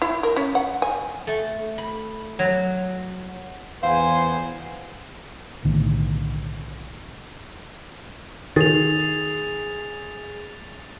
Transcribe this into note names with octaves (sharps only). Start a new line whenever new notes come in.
E4
A#4
C#4
F#5
G#5
A3
B5
F#3
E2 B3 C5 F5 G#5
B1 A2 D3 D#3
D#3 G#4 A6 F7